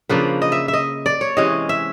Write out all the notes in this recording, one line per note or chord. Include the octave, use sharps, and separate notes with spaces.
C#3 F3 A#3 D4 B4
D#5
E5
E5
D#5
D5
C#5
C3 E3 G#3 C#4 D#5
E5